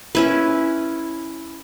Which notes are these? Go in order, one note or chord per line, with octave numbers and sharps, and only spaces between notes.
C#4 E4 B4